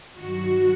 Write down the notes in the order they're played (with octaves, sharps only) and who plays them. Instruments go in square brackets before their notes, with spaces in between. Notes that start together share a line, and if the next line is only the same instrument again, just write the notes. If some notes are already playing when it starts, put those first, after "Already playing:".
[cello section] G2 D#3 F#3 F#4